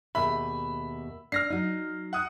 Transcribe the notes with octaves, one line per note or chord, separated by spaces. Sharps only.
D#2 B2 G#4 E5 B5
D4 F6 A#6 C7
F#3 D#4
F#5 D#6 F#6